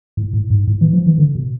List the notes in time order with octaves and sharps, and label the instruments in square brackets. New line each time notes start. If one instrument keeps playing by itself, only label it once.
[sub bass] A2
A2
G#2
A2
E3
F3
E3
D3
B2